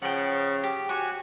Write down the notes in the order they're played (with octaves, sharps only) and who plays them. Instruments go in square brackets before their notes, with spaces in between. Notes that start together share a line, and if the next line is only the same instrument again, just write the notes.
[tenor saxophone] C#3 [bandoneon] F3 [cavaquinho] F#5 G5
[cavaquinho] G4
[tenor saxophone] F#4 [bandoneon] G4 G#5 [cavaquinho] C#6